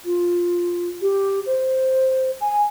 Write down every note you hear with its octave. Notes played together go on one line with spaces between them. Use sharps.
F4
G4
C5
G#5